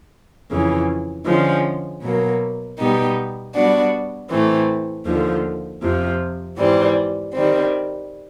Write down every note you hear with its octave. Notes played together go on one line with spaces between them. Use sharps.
F2 C#3 E3
D3 F3 G#3 C#4
B2 F#3 A#3
B2 G3 B3 D#4 G4
G3 B3 D4 F#4
A2 E3 A3 C4
D#2 D3 F3
F2 C3 F3
G#2 E3 G3 C4
D#3 G3 C4